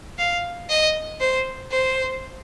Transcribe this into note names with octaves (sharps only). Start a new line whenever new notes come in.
F5
D#5
C5
C5